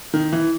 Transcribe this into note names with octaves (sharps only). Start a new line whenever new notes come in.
D#3
E3